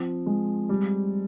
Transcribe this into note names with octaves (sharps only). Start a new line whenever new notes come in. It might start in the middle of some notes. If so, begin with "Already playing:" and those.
Already playing: F3 C4
G#3
G3